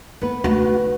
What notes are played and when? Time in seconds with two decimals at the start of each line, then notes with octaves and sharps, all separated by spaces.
0.22 A#3 B3 B4
0.44 D2 A3 D#4 F#4